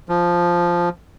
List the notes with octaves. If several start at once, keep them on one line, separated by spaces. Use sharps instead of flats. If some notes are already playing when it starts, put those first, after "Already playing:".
F3